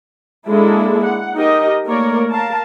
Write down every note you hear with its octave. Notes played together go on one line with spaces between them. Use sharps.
G#3 A#3 D4 E4 A4
F#5
D#4 G4 A#4 D#5
A3 A#3 A#4 C#5 D5
A#4 F5 A5